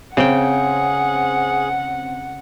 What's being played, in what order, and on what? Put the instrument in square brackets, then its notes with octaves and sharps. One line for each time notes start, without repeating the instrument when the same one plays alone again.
[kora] C#3 G5 [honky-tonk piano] C4 [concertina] G#4 [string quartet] F#5